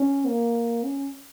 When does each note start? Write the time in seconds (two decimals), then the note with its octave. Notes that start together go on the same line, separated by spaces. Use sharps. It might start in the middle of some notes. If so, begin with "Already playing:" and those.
Already playing: C#4
0.27 A#3
0.84 C#4